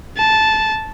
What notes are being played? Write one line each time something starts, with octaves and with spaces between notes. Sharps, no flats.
A5